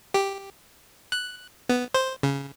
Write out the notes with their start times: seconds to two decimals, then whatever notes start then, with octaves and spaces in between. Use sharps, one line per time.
0.14 G4
1.12 F#6
1.69 B3
1.94 C5
2.23 C#3